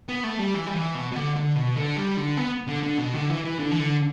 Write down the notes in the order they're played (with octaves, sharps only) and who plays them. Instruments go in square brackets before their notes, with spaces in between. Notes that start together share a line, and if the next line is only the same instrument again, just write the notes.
[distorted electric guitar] B3
A3
G3
E3
G3
E3
B2
B2
D3
D3
B2
D3
G3
D3
B3
D3
D3
B2
D3
E3
E3
D3
E3
D3